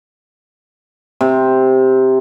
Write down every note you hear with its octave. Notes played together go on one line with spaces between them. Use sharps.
C3